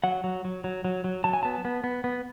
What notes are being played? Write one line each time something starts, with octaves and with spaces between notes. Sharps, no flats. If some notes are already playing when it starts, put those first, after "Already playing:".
F#3 F#5
F#3
F#3
F#3
F#3
F#3
F#3 A5
G#5
B3 A5
B3
B3
B3